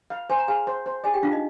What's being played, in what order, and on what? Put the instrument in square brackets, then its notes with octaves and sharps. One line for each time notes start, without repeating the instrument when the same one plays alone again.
[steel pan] F5
[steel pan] C5 [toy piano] G#5
[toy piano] A#5
[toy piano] G#4 G#5 [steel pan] F5
[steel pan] C5
C5
[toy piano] G#4 G#5 [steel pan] D5
[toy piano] G4 G5
[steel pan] D4 [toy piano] F4 F5
[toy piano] D#4 D#5